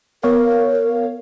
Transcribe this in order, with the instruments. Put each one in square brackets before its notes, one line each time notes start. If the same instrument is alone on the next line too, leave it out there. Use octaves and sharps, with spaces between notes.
[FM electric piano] B3 C#5 F5 [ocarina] A#4